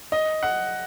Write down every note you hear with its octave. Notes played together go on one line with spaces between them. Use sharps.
D#5
F#5